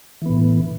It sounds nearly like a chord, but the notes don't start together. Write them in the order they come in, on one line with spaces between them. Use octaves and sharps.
E3 B3 A2